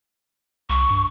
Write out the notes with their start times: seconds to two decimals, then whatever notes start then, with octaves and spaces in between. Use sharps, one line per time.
0.70 C2 C#6
0.90 G2